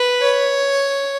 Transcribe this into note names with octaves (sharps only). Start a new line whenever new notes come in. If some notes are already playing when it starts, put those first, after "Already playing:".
Already playing: B4
C#5